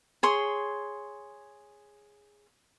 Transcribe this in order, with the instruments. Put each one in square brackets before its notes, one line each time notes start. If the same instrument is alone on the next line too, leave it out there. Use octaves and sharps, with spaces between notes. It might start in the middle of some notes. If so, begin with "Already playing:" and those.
[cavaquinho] G#4 C#5 C6